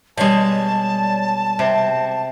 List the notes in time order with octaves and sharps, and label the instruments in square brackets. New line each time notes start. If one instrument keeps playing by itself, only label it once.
[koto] B2 G#3 [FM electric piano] G3 C#5 D5 [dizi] A5
[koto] C3